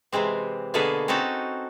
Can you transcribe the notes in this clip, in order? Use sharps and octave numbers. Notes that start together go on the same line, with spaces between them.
C3 E3 G#3 C4
B2 D3 A#3 G#4 A4 B4
C4 C#4 D#4 F#4 A4